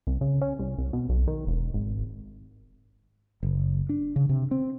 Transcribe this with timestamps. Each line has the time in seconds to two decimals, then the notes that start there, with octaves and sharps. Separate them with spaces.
0.07 C2
0.21 C#3
0.41 C#4
0.59 C2
0.78 C2
0.93 B2
1.09 B1
1.27 D#3
1.47 E1
1.74 G#1
3.43 F#1
3.89 D4
4.16 C#3
4.29 C3
4.51 C4